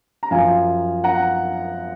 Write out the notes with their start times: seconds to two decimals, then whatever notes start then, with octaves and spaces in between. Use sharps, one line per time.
0.23 A#5
0.31 F#2 F3 F5 G#5
1.04 F#5 A#5